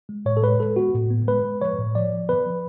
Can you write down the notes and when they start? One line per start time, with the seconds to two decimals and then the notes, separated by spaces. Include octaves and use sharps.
0.09 G#3
0.26 A2 C#5
0.37 A4
0.43 G#3 B4
0.60 G#3 A4
0.76 B3 F#4
0.94 A2
1.10 B3
1.28 G#3 B4
1.45 G#3
1.61 F3 C#5
1.78 A2
1.95 F3 D5
2.12 F3
2.29 B3 B4
2.46 F3